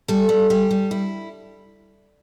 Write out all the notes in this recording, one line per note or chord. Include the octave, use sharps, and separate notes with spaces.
G3 A4
G3
G3 G4
G3
E4